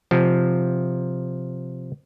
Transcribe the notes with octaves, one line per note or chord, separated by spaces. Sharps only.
C3 F3